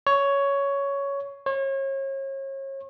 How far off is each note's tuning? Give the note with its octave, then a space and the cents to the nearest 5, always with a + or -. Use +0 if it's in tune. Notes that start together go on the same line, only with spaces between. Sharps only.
C#5 +10
C#5 -35